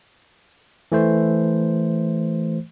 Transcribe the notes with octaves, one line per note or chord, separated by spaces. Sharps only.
E3 A3 C5